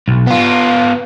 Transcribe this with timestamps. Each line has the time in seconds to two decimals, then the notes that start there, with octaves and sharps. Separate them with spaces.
0.08 B1
0.27 B3 F4